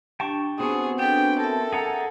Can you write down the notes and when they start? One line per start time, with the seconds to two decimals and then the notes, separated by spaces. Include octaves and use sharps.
0.20 D4 G4 G5 A5 C#6
0.59 B3 C4 F#4 G#4
0.99 D4 A4 B4 G5
1.40 A4 A#4 E5
1.73 G#4 F#5 A#5